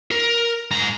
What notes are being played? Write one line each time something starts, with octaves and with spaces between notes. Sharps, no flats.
A#4
G#2 A#5